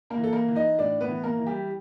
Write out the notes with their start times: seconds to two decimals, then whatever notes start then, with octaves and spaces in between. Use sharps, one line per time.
0.10 A#3 A#4
0.18 E3
0.24 A4
0.33 A#3 A#4
0.48 E3
0.55 D#4 D#5
0.78 A2 D4 D5
1.01 B3 B4
1.08 E3
1.24 A#3 A#4
1.39 E3
1.47 G3 G4